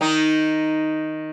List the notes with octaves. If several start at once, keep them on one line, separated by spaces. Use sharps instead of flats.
D#3 D#4